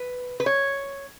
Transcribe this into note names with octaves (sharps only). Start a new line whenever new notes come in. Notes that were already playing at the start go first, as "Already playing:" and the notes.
Already playing: B4
B4
C#5